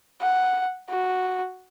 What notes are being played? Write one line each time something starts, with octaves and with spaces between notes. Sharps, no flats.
F#5
F#4